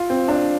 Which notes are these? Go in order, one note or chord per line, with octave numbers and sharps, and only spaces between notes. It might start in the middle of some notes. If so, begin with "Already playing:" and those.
Already playing: F4
C4
D4